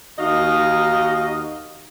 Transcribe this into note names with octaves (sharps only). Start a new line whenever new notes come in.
D#2 D#4 F#4 D#5 F5